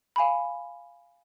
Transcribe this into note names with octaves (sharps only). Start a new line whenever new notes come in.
F5 G#5 B5